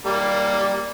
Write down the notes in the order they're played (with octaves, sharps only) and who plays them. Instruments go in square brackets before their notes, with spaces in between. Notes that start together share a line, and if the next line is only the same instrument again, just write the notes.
[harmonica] G3 A#3